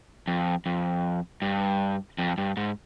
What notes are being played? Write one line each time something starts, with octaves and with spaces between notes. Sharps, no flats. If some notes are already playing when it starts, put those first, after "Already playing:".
F2
F2
G2
F2
G2
G#2